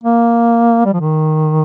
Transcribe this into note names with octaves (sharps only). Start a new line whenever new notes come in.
A#3
G3
F3
D#3